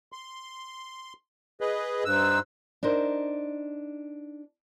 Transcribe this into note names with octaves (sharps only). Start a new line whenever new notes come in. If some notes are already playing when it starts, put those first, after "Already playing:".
C6
G#4 B4 D#5
G2 D#4 C5 E6 F#6
D4 D#4 A#4 C5